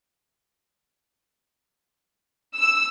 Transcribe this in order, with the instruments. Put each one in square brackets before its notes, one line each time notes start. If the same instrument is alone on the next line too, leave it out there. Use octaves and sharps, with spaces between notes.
[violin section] E6